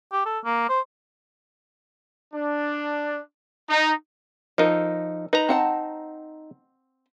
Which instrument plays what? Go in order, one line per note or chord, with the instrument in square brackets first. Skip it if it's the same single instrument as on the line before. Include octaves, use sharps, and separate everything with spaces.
[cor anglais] G4
A4
A#3
C5
[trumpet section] D4
D#4
[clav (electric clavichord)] F3 D#4 [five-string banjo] A4 A#4 D#5
[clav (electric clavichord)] D#4 A#5 [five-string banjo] B4
[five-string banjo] C4 F#5 A5